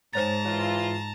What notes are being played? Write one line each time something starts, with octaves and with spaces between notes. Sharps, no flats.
G#2 C5 C#5 A5 A#5 A6
E3 F4 C#5